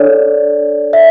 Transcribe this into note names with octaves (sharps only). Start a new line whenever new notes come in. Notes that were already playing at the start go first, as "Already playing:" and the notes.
Already playing: D4 A4 C#5 D5
E5